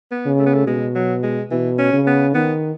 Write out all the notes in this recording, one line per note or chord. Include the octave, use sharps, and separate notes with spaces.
B3
C#3
A3
B3
A3
B2 G#3
F#3
G#3
B2 E3
C#4
C#3
B3
D#3 B3